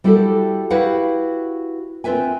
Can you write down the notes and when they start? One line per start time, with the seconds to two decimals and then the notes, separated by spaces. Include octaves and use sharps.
0.04 G3 E4 F#4 G4 A4
0.70 E4 F#4 G4 B4 F5 F#5
2.04 C4 F4 B4 E5 G#5